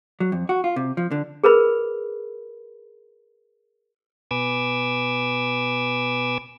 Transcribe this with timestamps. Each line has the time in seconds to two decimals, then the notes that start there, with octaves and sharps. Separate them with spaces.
0.20 F#3
0.32 F2
0.49 F#4
0.64 F4
0.76 C3
0.97 F3
1.11 D3
1.44 G#4 A#4 B4 B5
4.31 B2 B4 G#5 D6 E6 G#6